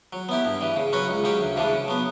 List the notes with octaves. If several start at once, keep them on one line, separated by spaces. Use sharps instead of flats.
F#3
B3 E4 G4
G2
E3 G3
C#3
F#3 C#4 F#4 B4
C#2
C#3 F#3 C#4 G4
D2
C#3 E3 G3 D4
C#3
F#3 B3